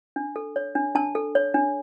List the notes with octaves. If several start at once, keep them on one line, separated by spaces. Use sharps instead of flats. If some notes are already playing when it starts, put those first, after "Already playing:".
D4
A4
C#5
D4
D4 A5
A4
C#5
D4